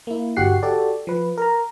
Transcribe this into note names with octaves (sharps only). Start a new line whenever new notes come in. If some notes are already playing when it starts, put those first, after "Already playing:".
A#3 E4
G1 D3 F#4 G4 F#5 C7
F#4 G4 A4 D5
F3 B4
A#4 A#5